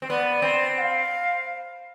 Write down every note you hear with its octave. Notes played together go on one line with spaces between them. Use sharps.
C4
B3 D5
C4
F#5
F5